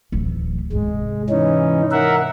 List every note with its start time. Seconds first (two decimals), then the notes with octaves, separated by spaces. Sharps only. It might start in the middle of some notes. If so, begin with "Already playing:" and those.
0.12 D1 E3
0.73 G#2 C3 G#3
1.30 E3 C#4 D#4
1.91 A#4 E5 F#5